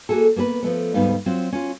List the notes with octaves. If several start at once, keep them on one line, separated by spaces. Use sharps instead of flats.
A#3 F#4 G#4 A4
A#3 B3 G#4 B4
F3 A3 B3
D2 G#2 G3 B3 D#4 F5
F#3 C4 F4
C#4 F4